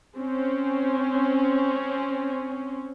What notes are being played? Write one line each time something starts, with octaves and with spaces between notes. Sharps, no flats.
C4 C#4